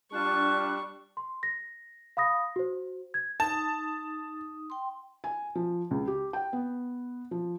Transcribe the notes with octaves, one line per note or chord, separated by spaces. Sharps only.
G3 D4 F4 A5 C#6 F#6
C6
A#6
F5 B5 D#6 A#6
F#4 C5
G#6
D#4 A5 D#6
G5 C6
G#5
F3
C#2
G4
G5
B3
F3